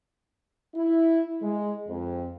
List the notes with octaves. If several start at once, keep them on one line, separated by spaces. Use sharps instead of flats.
E4
G#3
F2